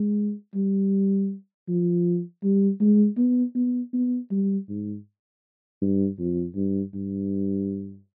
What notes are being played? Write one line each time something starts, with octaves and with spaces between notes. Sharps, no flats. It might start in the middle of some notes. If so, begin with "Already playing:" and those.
Already playing: G#3
G3
F3
G3
G#3
B3
B3
B3
G3
G#2
G2
F2
G2
G2